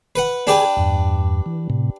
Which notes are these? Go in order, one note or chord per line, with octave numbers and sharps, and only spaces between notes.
B4 F#5
D4 G4 G#4 B4 G#5 G#6
E2 G2
E3
A2 C3